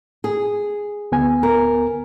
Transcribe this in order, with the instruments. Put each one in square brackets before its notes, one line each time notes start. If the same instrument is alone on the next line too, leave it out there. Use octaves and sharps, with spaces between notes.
[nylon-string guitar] G#4
[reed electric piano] D2 B3 G#5
[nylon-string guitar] A#4